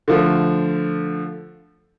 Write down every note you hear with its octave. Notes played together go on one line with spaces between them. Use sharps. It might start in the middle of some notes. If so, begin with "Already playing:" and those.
D3 F3 A3